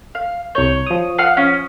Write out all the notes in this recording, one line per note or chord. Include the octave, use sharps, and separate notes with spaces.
F5
C2 C#5 G6
F3 D#6
F5 F#5 F6
C#4